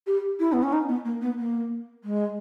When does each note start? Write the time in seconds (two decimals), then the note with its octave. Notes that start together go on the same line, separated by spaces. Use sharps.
0.07 G4
0.40 E4
0.53 B3
0.63 C#4
0.73 D#4
0.89 B3
1.05 A#3
1.21 B3
1.38 A#3
2.04 G#3